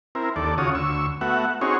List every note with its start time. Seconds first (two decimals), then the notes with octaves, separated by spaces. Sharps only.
0.15 C4 E4 A#4
0.36 D#2 A4 D5
0.58 C#3 F4 F#4 C#5 D#6
0.75 D2 C#6 E6
1.21 A3 B3 F#4 E5 F#5
1.61 C4 C#4 D#4 F#4 G#4 C#5